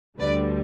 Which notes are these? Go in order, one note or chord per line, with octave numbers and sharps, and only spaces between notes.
D2 D3 G3 B4 D5